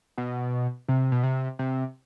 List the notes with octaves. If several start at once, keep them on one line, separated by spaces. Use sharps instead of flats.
B2
C3
B2
C3
C3